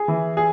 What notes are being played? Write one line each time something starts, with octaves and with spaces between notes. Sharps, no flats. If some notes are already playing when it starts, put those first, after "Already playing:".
Already playing: G#4
E3
G#4